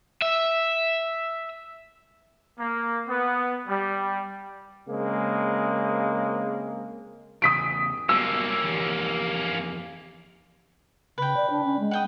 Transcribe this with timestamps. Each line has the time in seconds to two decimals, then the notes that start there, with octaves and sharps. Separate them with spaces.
0.22 E5
2.59 A#3
3.08 B3
3.68 G3
4.89 C#3 G#3 A#3 C4
7.42 E2 C#3 D#6 B6 D7
8.09 F#3 G3 A#3 B3 C#4 E6
8.64 F2 E3 G4
11.18 C#3 B4 G5
11.36 D5
11.50 D4
11.64 C#4
11.79 G#3
11.91 F#5 G5 D#6